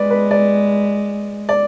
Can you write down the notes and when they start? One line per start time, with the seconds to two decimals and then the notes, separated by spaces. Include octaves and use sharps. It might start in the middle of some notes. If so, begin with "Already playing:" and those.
Already playing: G#3 B4 D5
0.10 B4
0.31 D5
1.49 D5